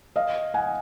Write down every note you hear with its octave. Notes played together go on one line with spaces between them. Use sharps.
D#5 F5
F#5 G#5